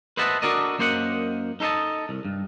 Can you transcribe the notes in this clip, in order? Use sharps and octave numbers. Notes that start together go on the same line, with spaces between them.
B4 C5 D#5 E5 F#5 A5
D4 F#4 A4 A#4 D5 D#5
F#2 A#3 C5 D#5 F#5
D#4 A4 C5 D#5 A5
C2
G2